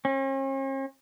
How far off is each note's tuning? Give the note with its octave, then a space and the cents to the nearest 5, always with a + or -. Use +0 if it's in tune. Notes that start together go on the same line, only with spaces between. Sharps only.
C#4 -45